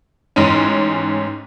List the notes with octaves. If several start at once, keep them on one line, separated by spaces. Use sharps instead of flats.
A1 G#2 C#4